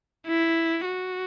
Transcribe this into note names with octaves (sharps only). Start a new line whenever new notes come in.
E4
F#4